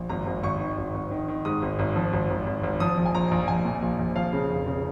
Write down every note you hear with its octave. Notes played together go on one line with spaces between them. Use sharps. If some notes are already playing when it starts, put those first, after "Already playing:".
Already playing: A#1
G#1 A#5
G#1
G#1 C#6
D#3
G#1
G#1
D#3
D#3
G#2 D#6
G#1
G#1
F3
G#1
G#1
G#1
G#1
F3 D#6
A#1
G#5
A#1 A#5
A#1
A#1 G#5
A#2
A#1
A#1
F3 F5
C#3
F1
C#3